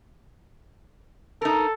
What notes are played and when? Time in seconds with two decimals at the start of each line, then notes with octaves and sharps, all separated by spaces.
1.42 D#4 A4 A#4